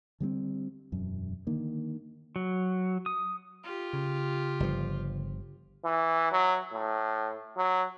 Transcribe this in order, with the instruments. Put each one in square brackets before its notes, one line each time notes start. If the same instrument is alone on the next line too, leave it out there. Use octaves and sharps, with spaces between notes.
[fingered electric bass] D3 G3 A#3 C4
E1 F#2
D3 D#3 A#3
[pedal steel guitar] F#3
D#6
[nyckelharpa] F4 G4
[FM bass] C#3
[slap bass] G1 F3
[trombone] E3
F#3
A2
F#3